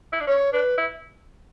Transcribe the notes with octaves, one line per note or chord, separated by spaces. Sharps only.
E4
D4
C#4 C#5
D4 B4
E4